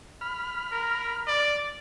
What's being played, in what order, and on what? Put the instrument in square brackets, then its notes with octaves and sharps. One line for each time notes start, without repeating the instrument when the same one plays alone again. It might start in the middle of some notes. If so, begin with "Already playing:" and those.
[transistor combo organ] B5 F6
[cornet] A#4
D5